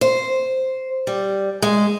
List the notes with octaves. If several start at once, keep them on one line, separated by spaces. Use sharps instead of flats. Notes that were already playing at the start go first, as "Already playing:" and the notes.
C5
G3
G#3